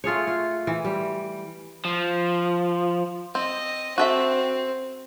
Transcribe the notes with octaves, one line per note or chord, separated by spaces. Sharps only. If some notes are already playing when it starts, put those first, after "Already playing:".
A3 F4 G#4 C#5
F4
E3
G3
F3
C4 D#5
C4 F#4 A4 E5